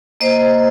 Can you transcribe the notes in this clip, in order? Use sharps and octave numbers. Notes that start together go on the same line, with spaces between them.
A#3 C5 D#5